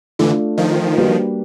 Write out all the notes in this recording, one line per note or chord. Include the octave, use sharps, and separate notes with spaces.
D3 E3 A3 D4 F4
D#3 F3
G3 A#3 D4 F#4 B4